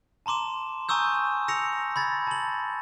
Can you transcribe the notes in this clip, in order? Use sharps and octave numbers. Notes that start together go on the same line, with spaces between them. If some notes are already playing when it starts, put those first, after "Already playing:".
A5 A#5 C6 D6 E7
G#5 A#5 C#6 D#6 E6 G6
E6 A#6 C#7 F7
B5 G#6 A6
A5 F#7